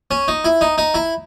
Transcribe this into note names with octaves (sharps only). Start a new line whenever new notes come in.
C#4
D#4
E4
D#4
D#4
E4